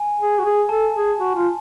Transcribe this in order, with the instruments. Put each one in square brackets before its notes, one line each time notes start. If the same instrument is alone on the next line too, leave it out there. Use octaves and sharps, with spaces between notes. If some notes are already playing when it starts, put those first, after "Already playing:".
Already playing: [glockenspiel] G#5
[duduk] G#4
F#4
G#4
[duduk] A4 [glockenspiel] A5
[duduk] G#4
F#4
F4